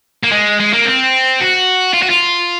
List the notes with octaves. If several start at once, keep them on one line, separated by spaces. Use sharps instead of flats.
A#3
G#3
G#3
A#3
C4
F#4
F4
F#4
F4